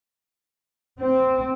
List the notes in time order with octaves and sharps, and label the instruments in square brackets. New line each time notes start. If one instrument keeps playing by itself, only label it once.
[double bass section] C4